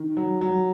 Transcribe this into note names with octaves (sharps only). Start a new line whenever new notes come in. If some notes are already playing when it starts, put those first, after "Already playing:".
Already playing: D#3
F#3
F#3